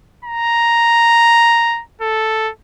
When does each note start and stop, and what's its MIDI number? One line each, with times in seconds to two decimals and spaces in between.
0.25 1.82 82
2.01 2.50 69